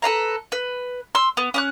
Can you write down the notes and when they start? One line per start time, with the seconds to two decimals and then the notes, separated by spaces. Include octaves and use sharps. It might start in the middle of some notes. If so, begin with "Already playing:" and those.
0.02 A4 B4 F5 A#5
0.52 B4
1.15 C6 E6
1.37 B3
1.54 C#4 D6 F#6